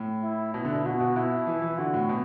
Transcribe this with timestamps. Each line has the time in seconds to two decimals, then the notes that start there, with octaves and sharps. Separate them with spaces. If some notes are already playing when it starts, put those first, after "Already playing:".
Already playing: A2
0.23 E4
0.54 B2 E4
0.65 D3
0.75 B2
0.85 B2 F#4
1.00 B2
1.16 B2 E4
1.47 E3
1.62 E3
1.78 D3 F#4
1.94 A2
2.09 B2